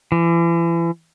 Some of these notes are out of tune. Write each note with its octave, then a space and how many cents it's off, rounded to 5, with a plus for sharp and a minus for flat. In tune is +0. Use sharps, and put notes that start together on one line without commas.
E3 +35